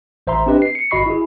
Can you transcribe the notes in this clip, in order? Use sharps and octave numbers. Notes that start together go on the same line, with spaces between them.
A1 C5 E5 A#5 C6
C4 D4 G4 B4 D#5
C7
C#7
G1 F#4 D#5 B5 C#6 C7
E4 G#4